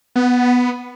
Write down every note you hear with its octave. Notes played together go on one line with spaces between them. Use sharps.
B3